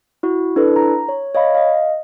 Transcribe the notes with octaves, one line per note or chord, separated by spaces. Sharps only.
E4 F#4
D4 E4 A4 B4
A#5
C#5
C#5 D#5 F5 B5
D#5 F5